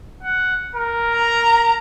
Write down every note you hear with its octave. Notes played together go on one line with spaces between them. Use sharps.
F#5
A#4
A#5